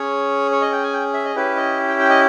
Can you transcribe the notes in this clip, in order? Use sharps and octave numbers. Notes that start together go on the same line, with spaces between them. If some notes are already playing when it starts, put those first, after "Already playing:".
Already playing: C#4 G#4 C#5
C#5
D#5
G5
G#5
G5
E5
D#5
C#4 E4 G4 B4
D#5
G5
G5
D#5